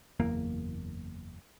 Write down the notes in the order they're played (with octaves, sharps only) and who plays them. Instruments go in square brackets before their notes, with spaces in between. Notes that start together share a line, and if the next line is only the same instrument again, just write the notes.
[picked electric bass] F#1 E2 A#3